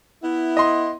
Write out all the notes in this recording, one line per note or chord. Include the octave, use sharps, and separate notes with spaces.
B3 E4
D#5 C6